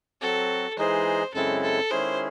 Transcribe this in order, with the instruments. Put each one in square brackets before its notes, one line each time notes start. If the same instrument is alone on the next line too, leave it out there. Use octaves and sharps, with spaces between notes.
[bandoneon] F#3 C4 F#4 [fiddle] A4
[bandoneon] E3 G#3 D#4 G#4 D#5 [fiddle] C5
[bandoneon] F#2 C#3 G#3 C4 E4 [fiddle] A4
[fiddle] A4
[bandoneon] D#3 G#3 C#4 E4 G#4 [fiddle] C5